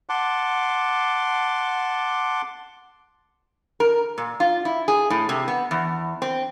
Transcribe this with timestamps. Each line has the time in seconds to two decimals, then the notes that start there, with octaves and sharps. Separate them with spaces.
0.09 F#5 A5 C6 D6
3.80 A#4
4.18 A#2
4.40 F4
4.65 E4
4.88 G#4
5.10 A2
5.29 C3
5.48 B3
5.71 E2
6.22 C4